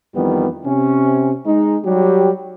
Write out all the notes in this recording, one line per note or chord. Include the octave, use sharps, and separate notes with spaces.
F2 D#3 E3 G3 B3
C3 C#4
G#3 D#4
F#3 G3 G4